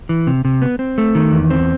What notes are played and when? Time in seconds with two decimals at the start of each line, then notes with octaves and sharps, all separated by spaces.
0.09 E3
0.27 C3
0.45 C3
0.62 B3
0.79 C4
0.98 A3
1.15 D#3
1.32 E2
1.50 C4